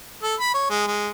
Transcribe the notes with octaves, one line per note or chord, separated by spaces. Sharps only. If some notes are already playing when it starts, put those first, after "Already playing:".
A4
B5
C#5
G#3
G#3